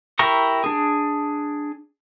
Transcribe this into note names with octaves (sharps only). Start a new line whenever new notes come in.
E4 G4 A#4 A#5 C#6
D4 G#4